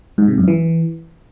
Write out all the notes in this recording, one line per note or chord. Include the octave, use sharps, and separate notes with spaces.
G#2
C3
F#2
E3